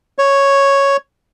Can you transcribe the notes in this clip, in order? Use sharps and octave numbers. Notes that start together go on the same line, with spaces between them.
C#5